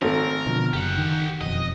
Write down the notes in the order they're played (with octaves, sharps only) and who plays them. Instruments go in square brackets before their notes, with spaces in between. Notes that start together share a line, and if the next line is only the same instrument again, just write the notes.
[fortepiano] G#1 A3 [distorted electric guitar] A#4
[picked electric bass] B2 D3 F3
[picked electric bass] F#1 [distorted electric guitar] G4 F#5
[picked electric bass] D#3
[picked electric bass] E1 F2 [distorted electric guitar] D#5